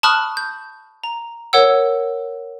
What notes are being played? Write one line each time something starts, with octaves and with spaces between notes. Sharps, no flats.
A5 B5 C#6 D#6 F6 F#6
G6
A#5
A#4 C#5 F#5 E6